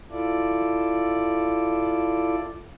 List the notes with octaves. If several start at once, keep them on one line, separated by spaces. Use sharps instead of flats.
E4 F4 A4 D5